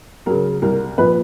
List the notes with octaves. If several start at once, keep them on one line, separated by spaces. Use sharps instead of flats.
C#3 F#3 A#4
C2 A#4
A#2 F3 B4